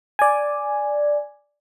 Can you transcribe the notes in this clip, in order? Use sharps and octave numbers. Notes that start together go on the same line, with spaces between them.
D5 G#5